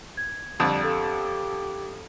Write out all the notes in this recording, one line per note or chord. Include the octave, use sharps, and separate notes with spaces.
G#6
F2 D3 G3
G4 A4 F5